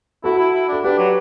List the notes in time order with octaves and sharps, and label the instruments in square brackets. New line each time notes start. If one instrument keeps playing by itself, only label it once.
[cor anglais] E4 [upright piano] F#4 A4
[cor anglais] E4
E4
[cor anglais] D4 [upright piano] A4
[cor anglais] D4 [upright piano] G4 B4
[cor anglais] F#3